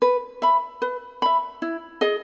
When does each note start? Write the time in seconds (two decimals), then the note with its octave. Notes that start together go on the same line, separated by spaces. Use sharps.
0.02 B4
0.42 E5 B5
0.82 B4
1.22 E5 B5
1.62 E4
2.01 G#4 D#5